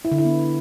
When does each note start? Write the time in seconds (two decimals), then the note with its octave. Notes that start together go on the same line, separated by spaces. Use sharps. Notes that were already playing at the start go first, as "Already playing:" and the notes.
0.05 E4
0.11 D3
0.18 E4
0.25 B3